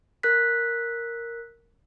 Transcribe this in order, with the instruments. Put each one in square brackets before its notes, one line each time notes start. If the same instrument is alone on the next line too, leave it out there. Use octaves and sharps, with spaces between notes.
[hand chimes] A#4 F#6 B6